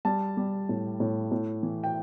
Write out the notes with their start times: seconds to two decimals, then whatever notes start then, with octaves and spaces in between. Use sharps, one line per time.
0.05 G3 A5
0.37 G3
0.69 A2
1.00 A2
1.31 A2
1.63 E3
1.84 G5